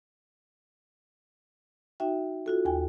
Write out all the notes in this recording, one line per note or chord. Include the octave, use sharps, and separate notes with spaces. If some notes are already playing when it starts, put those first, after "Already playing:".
D#4 F#4 E5 G5
F4 F#4 A4
D#2 G5 G#5